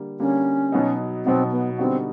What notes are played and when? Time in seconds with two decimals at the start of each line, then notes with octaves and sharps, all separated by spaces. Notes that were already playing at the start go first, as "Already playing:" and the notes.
Already playing: D3 G3 A#3
0.19 D3 G3 A#3 C#4
0.72 B2 F#3 B3 D#4
1.25 B2 F#3 B3 C4 D#4
1.52 B3
1.78 D3 G3 B3 C4 D#4 F#4